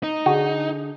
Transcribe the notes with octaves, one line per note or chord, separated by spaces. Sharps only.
D#4
D3 D4 F#4 G#4